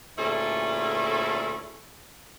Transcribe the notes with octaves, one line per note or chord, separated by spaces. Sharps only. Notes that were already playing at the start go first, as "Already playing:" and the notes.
D2 A#2 C#4 E4 G#4 A4